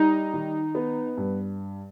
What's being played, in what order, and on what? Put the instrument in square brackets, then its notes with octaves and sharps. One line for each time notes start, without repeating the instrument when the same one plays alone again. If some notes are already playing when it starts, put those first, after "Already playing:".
Already playing: [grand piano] G3 [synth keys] D#4
[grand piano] D#3
B3
G2